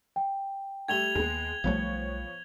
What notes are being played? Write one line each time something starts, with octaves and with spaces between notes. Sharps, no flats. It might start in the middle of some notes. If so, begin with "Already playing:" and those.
G5
G3 A3 G4 G#6 F7 G7
D#2 G#3 B3
B1 F3 G3 A3 B3 C#5